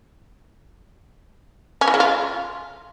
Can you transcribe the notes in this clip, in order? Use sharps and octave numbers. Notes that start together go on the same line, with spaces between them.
C#4
E3
C#3
F4